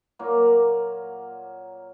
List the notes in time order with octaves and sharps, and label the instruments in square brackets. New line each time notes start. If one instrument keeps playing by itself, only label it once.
[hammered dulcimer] A#2 F#3 A#3